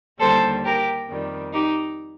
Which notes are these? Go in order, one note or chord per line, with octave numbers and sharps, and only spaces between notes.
D#2 D3 G3 A4 C5
G4 A#4
F2 D#3 G3
D#4 G4